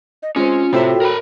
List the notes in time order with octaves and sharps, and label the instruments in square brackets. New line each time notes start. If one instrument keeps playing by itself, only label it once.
[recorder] D#5
[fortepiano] G#3 C4 [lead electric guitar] C#4 [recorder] F4
[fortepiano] A2 C5 E5 [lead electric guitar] C3 [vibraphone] F#4 A4 G5
[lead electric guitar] A#4 B5